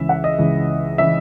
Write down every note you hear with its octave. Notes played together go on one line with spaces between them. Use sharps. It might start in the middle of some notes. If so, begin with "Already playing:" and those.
Already playing: C#2 C#3 E3 E5
F#5
D#5
C#2 C#3 E3
C#3 E3 E5